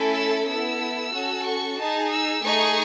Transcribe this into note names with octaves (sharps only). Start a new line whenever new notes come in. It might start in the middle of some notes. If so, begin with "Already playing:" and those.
Already playing: A3 C#4 E4 A4
E6
B3 E4 A4 E6
C#4 F#4 A4
C#6
D#4 G#4 A5
E6
A3 D#4 G#4 C#6